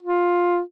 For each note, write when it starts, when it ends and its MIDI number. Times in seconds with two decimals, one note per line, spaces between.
0.03 0.60 65